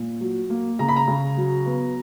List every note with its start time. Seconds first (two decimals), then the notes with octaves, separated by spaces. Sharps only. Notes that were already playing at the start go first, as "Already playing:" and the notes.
Already playing: A#2
0.21 F#3
0.50 A#3
0.79 C#3 A#5
0.88 B5
0.96 A#5
1.07 C#3
1.37 F#3
1.66 B3